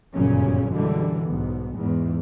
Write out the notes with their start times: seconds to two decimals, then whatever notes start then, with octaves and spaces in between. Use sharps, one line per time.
0.14 G1 F#2 A#2 C#3 F#3 C#4
0.72 F#2 B2 D3 E3 G3 G#3
1.28 B1 G#2 B3
1.74 E2 G#2